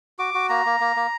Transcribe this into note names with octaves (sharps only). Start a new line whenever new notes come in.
F#4 D6
F#4
A#3 A#5
A#3
A#3
A#3